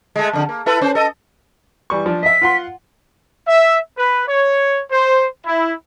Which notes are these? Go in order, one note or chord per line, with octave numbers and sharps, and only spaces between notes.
G#3 A3
F2 D3
A#3
E4 A4 B4
C#4 C5
A4 D#5
E3 G3 C#6
F3 D4
D#5 E5 B6
F4 F#5 C6
E5
B4
C#5
C5
E4